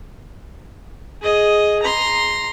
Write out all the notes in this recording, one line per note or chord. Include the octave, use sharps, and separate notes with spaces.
G#4 D#5
A#5 C6